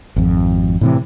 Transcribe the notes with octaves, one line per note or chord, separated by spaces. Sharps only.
G#1 F2
A2 C3 E3